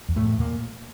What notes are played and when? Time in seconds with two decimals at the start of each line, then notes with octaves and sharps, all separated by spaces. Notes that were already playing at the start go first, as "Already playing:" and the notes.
0.09 E2
0.16 A2 A3
0.24 E2
0.40 A#2 A#3